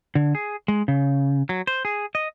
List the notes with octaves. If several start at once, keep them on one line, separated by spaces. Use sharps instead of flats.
D3
G#4
G#3
C#3
F#3
C5
G#4
D#5